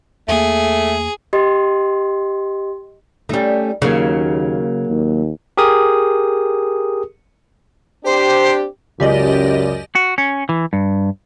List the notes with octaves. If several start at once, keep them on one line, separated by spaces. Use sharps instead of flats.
E2 A3 A#3 G#4
G4 D#5 C6
G3 A3 C#4 D#4
D#2 C#3 F#3 A#3
D#2
G4 G#4 A#4 D#6
C4 D4 G4 C5
C#2 F#2 G4 D5 D#5
F#4
C#4
E3
G2